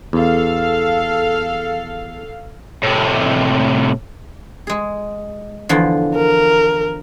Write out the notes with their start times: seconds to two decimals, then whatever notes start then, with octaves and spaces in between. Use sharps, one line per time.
0.13 E2 A4 F5
2.83 A2 C3
4.67 G#3 G#4
5.69 E2 D3 F3
6.16 A#4